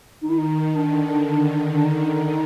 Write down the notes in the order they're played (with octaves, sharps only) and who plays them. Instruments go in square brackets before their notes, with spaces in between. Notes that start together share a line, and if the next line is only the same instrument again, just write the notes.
[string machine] D#3 [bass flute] D#4
[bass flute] E4
D#4
[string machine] D3 [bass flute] D4
[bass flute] D4
D#4